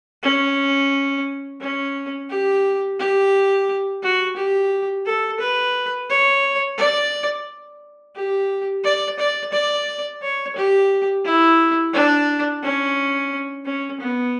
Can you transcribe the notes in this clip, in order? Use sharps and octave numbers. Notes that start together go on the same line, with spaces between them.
C#4
C#4
G4
G4
F#4
G4
A4
B4
C#5
D5
G4
D5
D5
D5
C#5
G4
E4
D4
C#4
C#4
B3